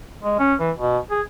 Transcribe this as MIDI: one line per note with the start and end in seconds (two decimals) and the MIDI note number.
0.23 0.38 56
0.39 0.54 61
0.60 0.71 52
0.78 0.98 47
1.11 1.22 68